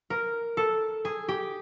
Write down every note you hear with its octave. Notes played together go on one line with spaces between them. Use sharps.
A#4
A4
G#4
G4